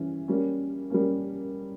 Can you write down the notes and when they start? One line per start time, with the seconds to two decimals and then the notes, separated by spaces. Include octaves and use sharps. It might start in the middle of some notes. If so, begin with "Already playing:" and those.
Already playing: E3 G3 C#4
0.28 G3 A#3 C#4
0.90 G3 A#3 C#4